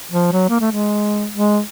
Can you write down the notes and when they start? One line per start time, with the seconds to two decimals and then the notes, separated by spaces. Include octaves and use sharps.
0.12 F3
0.32 F#3
0.49 A#3
0.61 A3
0.72 G#3
1.33 G#3